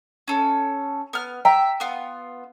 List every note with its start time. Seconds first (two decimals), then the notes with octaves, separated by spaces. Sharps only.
0.28 C#4 A4
1.13 B3 F6
1.45 E5 G5 A#5
1.80 B3 F4